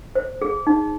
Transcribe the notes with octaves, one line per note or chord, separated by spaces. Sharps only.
C5
G#4
D#4